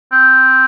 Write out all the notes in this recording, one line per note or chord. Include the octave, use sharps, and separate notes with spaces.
C4